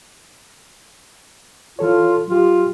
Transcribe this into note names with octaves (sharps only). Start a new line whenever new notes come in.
E3 F4 A4 C#5
F#3 F4 G4